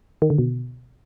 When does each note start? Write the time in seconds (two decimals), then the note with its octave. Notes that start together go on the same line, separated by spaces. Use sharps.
0.22 D#3
0.30 D3
0.38 B2